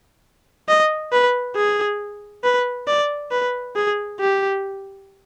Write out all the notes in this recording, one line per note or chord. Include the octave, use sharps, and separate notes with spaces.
D#5
B4
G#4
B4
D5
B4
G#4
G4